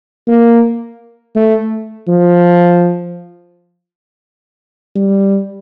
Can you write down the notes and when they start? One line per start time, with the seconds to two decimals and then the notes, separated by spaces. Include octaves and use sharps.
0.27 A#3
1.36 A3
2.08 F3
4.96 G3